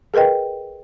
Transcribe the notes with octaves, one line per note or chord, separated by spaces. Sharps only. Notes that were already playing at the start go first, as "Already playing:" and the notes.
G#4 A#4 B4 D#5 G5